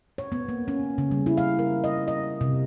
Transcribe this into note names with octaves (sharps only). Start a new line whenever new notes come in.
C#5
B3
A#3
C#4
C#3
G3
E4
F5
A#4
D#5
D#5
C3